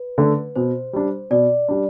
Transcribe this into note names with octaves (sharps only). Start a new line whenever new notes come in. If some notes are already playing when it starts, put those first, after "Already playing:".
Already playing: B4
D3 A3 D4
B2 C5
G3 D4
B2 D5
G3 D4